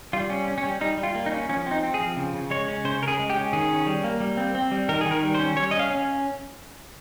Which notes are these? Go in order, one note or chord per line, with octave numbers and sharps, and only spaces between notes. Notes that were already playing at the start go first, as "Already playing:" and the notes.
G3 F4
C#4
C#4
C#4
G3
G3 D#4
G3
F4
A#3
D#4
C#4
F3 C#4
C4
D#4
C4
G#4
F3
C#3
C#3
G#3 C#5
C#4
C#3 C5
C#3 A#4
G#4
G#3
G4
C#4
D#3 G#4
C#4
G3
A#3
G3
C4
C4
G3
D#3 A#4
D#3 G#4
A#4
G3
C5
C#4
G3 C#5
C#4 D#5
F5
C#4